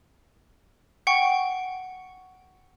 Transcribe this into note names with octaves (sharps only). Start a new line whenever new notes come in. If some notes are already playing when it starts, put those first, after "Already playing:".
F#5 G5 C#6